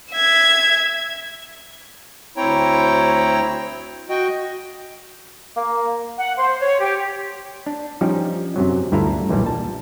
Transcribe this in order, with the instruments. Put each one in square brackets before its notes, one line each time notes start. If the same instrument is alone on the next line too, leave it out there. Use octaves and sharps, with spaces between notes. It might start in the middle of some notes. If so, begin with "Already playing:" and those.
[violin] E5 G#6
[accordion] D2 C4 E4 C#5 G5 A#5
F#4 D#5 G5
[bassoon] A#3
[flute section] F#5
C5
C#5
G4
[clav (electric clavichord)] D4
F3 G3 C#4 D#4 G4
F#2 C3 F#3
D2 G2 E4 F4 A4 A#5
B1 E2 A#2 G3
A5